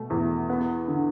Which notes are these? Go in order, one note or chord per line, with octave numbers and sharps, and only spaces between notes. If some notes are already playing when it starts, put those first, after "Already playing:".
Already playing: B2 A3
E2
B3
D3